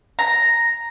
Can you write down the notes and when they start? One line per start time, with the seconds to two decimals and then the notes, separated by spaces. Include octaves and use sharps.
0.19 A#5